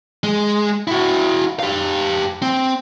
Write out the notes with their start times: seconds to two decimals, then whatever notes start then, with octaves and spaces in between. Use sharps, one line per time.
0.24 G#3
0.87 E4 F#4
1.59 G4 F5
2.42 C4